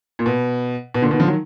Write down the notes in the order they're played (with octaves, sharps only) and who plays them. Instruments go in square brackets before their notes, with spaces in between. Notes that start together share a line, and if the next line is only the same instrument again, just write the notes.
[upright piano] A#2
B2
B2
A#2 D3
B2 D#3
D3 F3
D#3 F#3